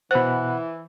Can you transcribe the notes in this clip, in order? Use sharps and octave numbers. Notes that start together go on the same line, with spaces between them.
B2 E3 C5 F#5 B5 F#6